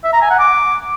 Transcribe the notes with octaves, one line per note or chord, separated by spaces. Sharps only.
E5
A#5
G#5
F#5
D6